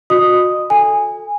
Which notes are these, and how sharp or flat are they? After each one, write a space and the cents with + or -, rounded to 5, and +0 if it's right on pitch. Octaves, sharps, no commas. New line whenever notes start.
F#4 -30 D#5 -30 D#6 +0
A4 -5 G#5 -15